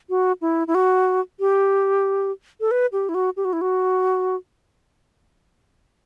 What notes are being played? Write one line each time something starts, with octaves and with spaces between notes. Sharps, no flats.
F#4
E4
E4
F#4
G4
A4
B4
G4
E4
F#4
G4
F#4
E4
F#4